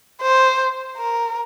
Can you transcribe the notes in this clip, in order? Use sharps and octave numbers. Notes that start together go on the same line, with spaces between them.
C5
A#4